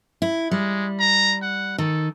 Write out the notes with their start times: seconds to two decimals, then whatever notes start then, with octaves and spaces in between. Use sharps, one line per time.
0.22 E4
0.51 G3 G#3
1.00 A#5
1.42 F#5
1.78 D#3 A4